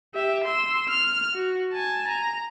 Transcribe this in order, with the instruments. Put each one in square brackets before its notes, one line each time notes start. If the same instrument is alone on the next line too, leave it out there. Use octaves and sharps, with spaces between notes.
[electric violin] G4 E5
C6 E6
F6
F#4
G#5 A5
A#5